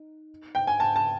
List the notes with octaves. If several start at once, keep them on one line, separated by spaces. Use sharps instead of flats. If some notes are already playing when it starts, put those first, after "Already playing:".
Already playing: D#4
G5
G#5
A5
A5